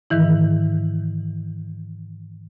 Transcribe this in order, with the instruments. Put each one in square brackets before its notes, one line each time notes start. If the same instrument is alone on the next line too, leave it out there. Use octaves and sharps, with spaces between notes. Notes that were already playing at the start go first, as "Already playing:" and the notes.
[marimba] G#2 D#3 E3 E4